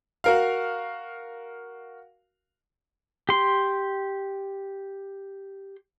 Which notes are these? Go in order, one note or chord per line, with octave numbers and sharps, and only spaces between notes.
F#4 A#4 F5
G4 C6